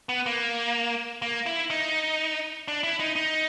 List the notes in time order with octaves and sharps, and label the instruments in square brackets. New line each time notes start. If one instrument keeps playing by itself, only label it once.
[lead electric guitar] B3
A#3
A#3
E4
D#4
D4
E4
D#4
D#4